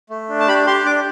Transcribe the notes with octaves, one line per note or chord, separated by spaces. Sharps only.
A3
D4
A5
G4 B5
G4 C6
D4 D6